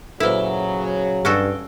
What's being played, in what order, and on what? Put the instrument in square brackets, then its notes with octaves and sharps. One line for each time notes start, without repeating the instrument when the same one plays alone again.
[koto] A#2 E4 [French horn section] C#3 F#3 [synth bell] A4 B4 C5
[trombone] G2 [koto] C#4 F#4 A4 [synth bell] G4